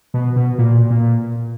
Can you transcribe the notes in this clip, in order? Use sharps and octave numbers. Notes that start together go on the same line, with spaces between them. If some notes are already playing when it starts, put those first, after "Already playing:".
B2
B2
A#2
A#2